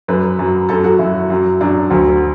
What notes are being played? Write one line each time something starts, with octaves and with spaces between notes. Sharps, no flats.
F#2 F#3 B4
F#2 F#3
F#2 F#3 A4
F#4
F#2 F#3 E4
F#2 F#3
F#2 F#3 D4
D2 D3 F#3